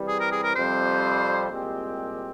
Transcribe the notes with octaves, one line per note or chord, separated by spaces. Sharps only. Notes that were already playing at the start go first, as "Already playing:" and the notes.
Already playing: C3 E3 G3
G#4
A#4
G#4
A#4
F2 C3 G3 C5
C2 A#2 G#3 C4 G4